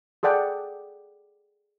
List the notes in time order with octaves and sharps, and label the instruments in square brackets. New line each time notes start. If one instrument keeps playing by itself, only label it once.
[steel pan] G#4 A4 D5 F#5 G5